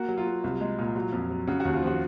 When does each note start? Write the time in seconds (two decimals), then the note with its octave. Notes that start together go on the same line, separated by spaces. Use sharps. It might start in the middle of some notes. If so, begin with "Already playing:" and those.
Already playing: A#3 F#4
0.08 F#3
0.18 F4
0.26 F#3
0.44 C2
0.61 G#3
0.78 A#2
0.96 F#3
1.12 F2
1.30 F#3
1.47 C#3 F#4
1.60 F#4
1.65 D#2
1.74 F4
1.83 F3 F#4